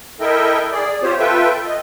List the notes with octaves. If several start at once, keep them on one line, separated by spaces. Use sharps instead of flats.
E4 A4 A#4 D#5 E5 G5
G#4 D5
C4 F4 G4 C5 C#5
F4 A4 B4 E5 G5
D#5